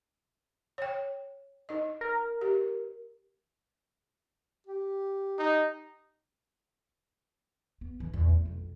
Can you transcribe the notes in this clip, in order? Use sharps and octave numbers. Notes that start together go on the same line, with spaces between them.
C#5 G5
D#4 D#5
A#4
G4
G4
D#4
B3
A2 E3
E2 A#2
A3
B1 F2